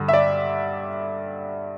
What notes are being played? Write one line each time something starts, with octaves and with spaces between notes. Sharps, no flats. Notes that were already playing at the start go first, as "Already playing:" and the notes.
Already playing: G2 D3
E5
D5